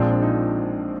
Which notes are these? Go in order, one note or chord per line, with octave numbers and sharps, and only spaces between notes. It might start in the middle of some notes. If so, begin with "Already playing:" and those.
Already playing: A#1 A#2 F3 G#3 C4 D4
D4
D#4